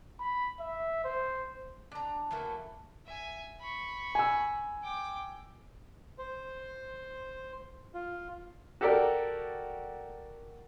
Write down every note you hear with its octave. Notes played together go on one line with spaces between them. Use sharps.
B5
E5
C5
D4 A#5
E3 F#3 A3 A#3
E5 G#5
B5 C#6
G#5 E6
G5 D6
C5
F4
F#4 G4 A4 A#4 D5